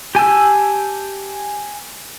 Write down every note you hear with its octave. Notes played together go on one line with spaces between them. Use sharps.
G4 G#5 A5 E6